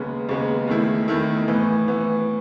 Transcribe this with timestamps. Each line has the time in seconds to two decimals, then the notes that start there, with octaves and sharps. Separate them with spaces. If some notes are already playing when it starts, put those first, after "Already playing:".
Already playing: D#2 C#3 G#3 B3
0.29 D#2 C#3 G#3 B3
0.68 E2 D#3 A3 E4
1.08 E2 D#3 A3 E4
1.47 A2 E3 B3
1.88 A2 E3 B3